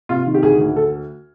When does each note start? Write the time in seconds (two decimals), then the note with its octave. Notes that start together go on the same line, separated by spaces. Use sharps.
0.09 C3 F4
0.27 D#3
0.34 G4
0.43 D2 G#4
0.60 D2
0.76 A4